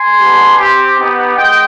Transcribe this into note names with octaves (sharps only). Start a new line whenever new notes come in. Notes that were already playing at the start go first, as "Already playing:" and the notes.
Already playing: G#5 C6
B3 D4 G4
C4 G4
B3 D#4 G4
G#3 D#5 G5